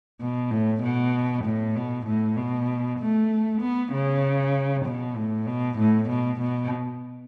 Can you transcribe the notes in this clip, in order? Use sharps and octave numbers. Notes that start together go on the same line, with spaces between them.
B2
A2
B2
A2
B2
A2
B2
A3
B3
C#3
B2
A2
B2
A2
B2
B2